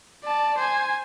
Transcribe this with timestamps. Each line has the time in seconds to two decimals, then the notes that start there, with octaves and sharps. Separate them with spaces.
0.24 D5 A5
0.58 C5 G#5